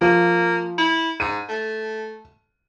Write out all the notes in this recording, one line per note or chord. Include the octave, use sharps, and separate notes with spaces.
F3 A#3
E4
G#2 D#7
A3